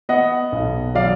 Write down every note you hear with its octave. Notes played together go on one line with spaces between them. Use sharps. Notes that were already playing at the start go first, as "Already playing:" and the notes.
B3 D#5 F#5
B1
F#3 D5 F5